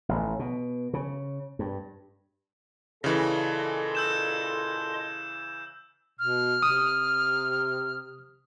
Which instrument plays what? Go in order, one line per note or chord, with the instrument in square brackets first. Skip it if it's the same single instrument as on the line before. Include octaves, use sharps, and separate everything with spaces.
[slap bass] A1
B2
C#3
G2
[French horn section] A#2 A4 [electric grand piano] C#3 E3 [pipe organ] D#5 C6
[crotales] E6 G6 E7
[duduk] B2 [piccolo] F6
[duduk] C3 [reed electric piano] D#6